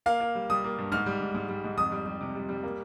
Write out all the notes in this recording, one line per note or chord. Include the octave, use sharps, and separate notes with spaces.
A#3 F5
A#3
G3
G3 D#6
A#3
G2
G#2 F6
G3
G#2
G#2
G3
G#2
F2 D#6
G3
G3
C3
G3
G3
A#3